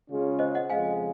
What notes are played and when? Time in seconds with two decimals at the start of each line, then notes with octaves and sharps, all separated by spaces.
0.08 C#3 G#3 C#4 F4 G#4
0.39 C5 D#5
0.55 D#5 F#5
0.70 F2 C#3 G#3 F5 G#5